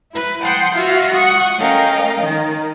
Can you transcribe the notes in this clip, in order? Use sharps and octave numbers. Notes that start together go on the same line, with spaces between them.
E4 B4
F#5 G5 A5 C6 D#6 G6
F4 F#4 E5 F5
F#5 C#6 D#6
A3 C#4 A#4 D#5 F5 G5
D#3